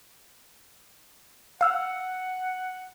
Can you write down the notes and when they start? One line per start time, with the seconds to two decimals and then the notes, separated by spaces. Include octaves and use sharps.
1.61 F5 F#5 E6 F6